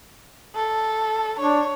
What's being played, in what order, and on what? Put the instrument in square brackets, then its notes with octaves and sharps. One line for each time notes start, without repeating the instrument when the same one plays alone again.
[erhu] A4
[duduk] D4 [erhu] C#5